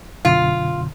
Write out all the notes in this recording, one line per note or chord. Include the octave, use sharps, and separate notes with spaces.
F#2 B2 D3 F4